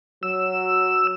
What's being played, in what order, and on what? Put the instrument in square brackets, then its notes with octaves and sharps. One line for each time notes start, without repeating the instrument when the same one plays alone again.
[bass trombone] F#3 [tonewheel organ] E6